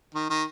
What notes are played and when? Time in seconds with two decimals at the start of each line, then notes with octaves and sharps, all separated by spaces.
0.15 D#3
0.30 D#3